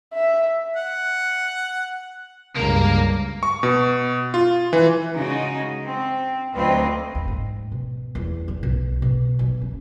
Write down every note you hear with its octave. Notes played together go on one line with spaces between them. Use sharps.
E5
F#5
C#2 G2 A#3 A#4
C#6
B2
F4
E3
C#3 G#3 D#4 F#4 D#5
C4
D2 F#3 C4 F4 B4 D#5
D#2
G#2
B2
E2
E3
B1
B2
B1
C#4